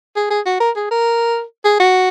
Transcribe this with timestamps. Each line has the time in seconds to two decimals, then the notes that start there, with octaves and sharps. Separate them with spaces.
0.16 G#4
0.31 G#4
0.46 F#4
0.60 A#4
0.76 G#4
0.91 A#4
1.65 G#4
1.80 F#4